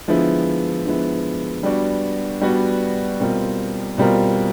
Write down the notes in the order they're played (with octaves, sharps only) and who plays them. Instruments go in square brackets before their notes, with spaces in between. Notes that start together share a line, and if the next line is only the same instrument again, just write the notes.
[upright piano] D3 F3 G#3 B3 E4
D3 F3 G#3 B3 E4
G3 B3 D4 F#4
G3 B3 D4 F#4
B2 G3 C4 F4 A#4
B2 G3 C4 F4 A#4